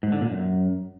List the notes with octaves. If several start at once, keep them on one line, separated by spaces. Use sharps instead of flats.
G#2
D3
A#2
F#2